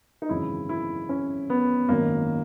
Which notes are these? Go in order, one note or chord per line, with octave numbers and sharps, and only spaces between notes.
D#4
G#1 F#2 C#3 E3 E4
E4
C#4
B3
G#1 F#2 D#3 A#3